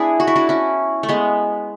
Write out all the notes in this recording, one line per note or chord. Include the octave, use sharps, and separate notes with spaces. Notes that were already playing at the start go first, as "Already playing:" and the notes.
Already playing: B3 D4 E4 G#4
F#4
E4
D4 F#4
C#4 E4
A3
G#3 B3